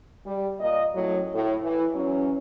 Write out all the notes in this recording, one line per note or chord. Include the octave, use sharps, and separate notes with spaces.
G3
A#2 D#5
F#2 A2 F#3
A2
E3
E2 F#3 C#4